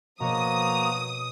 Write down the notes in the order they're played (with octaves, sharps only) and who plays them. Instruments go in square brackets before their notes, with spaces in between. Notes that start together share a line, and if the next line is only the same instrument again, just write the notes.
[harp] B2 C#5 [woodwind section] F3 [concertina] A#3 F#4 A#5 [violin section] D#6